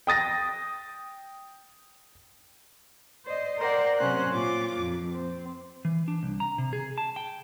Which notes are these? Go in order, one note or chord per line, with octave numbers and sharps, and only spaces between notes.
G5 D#6 A6 A#6
C5 D5 D#5
A#4 C5 D5 F#5 G5
C3 F#3 C#4 C5 F#6
A#2 F4 D6
F2
C4
E3
D4
C2
A#5
C3
G#4
A5
G5